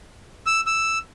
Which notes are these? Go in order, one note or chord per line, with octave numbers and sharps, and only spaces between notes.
E6
E6